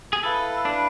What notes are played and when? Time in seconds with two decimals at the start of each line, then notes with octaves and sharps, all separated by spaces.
0.13 G#4
0.23 E4 A4 B4 F5
0.65 D4